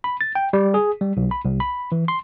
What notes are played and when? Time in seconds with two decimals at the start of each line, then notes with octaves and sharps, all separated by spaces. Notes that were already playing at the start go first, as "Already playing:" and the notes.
0.04 B5
0.21 A6
0.35 G5
0.53 G3
0.74 G#4
1.01 G3
1.17 B1
1.31 B5
1.45 C2
1.60 B5
1.92 E3
2.08 C6